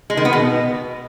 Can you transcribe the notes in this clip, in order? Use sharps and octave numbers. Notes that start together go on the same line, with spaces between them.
G#3
D#3
B3
B2